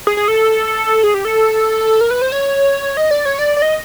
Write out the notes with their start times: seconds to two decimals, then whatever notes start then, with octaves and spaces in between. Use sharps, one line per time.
0.07 G#4
0.17 G#4
0.28 A4
1.03 G#4
1.14 G4
1.25 A4
2.01 A#4
2.11 B4
2.22 C5
2.32 C#5
2.97 D#5
3.11 D5
3.25 C#5
3.39 D5
3.57 D5
3.62 D#5